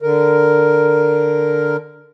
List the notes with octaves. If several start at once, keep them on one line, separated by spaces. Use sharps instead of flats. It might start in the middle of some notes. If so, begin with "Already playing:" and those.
D3 A#4